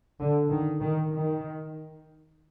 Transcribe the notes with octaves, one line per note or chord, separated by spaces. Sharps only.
D3
D#3
D#3
D#3